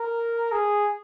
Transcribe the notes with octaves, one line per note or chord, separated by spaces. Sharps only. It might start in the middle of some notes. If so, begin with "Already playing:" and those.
Already playing: A#4
G#4